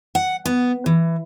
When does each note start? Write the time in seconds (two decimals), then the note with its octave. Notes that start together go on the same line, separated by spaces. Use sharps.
0.15 F#5
0.45 B3
0.86 E3